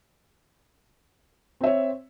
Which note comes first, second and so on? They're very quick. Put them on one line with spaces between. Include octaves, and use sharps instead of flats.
C4 E5 C#5